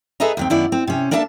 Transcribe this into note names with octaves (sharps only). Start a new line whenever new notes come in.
G#4 A4 B4 D#5 E5 A#5
D#2 D#3 C4
F#2 D#3 B3 E4 D5
C4
C3 C#4
A#3 D4 E4 A4 E5 A5